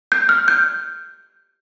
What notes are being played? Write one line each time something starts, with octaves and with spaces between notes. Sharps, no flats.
G6
F6
G6